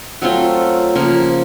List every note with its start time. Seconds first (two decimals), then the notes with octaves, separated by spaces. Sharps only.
0.22 F#3 A3 C4 F4
0.96 C#3 F3 A#3